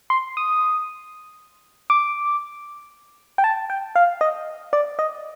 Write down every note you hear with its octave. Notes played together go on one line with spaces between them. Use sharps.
C6
D#6
D6
G5
A5
G5
F5
D#5
D5
D#5